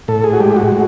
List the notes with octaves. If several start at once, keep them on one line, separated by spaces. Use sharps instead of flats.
A2 A4
G#4
F#4
G#3 G4
F#4
A2